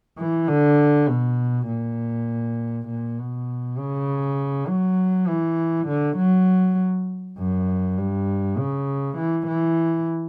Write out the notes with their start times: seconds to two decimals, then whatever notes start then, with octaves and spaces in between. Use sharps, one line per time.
0.18 E3
0.48 D3
1.09 B2
1.68 A#2
2.89 A#2
3.18 B2
3.78 C#3
4.68 F#3
5.28 E3
5.88 D3
6.17 F#3
7.38 F#2
7.98 G2
8.58 C#3
9.18 E3
9.47 E3